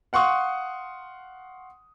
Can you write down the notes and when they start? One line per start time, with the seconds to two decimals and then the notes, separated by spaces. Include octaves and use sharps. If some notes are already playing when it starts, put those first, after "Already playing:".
0.13 F5 F#5 C6 C#6 D#6